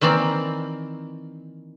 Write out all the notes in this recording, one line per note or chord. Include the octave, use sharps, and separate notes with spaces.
D#3 E3 A#3 C4 D5